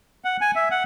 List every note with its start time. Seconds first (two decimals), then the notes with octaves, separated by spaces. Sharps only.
0.25 F#5
0.41 G#5
0.56 E5
0.71 F#5